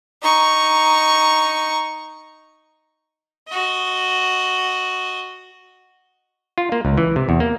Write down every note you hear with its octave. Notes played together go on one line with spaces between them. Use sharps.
D#4 C#6
F#4 D#5
F4
A#3
C#2
E3
C3
E2
A#3